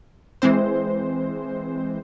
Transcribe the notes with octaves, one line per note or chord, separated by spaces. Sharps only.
E3 G#3 C4 C5